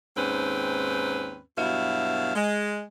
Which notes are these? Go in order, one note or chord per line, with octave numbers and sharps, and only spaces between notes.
D#2 G#2 C4 C#4 B4
G2 B2 F#3 E4 F5
G#3